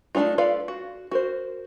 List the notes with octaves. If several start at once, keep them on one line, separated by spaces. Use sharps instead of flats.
A3 C4 D4 D#4 F4
F4 A4 B4 D5 F5
F#4
F#4 A#4 C5